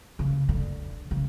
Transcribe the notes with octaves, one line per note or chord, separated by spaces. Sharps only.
C#3
D3
C#3